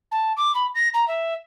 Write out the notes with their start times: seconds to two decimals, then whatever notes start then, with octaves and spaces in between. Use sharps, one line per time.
0.11 A5
0.36 D6
0.54 B5
0.74 A#6
0.94 A#5
1.07 E5